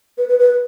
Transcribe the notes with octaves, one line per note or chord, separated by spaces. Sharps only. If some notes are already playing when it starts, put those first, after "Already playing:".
B4
B4
B4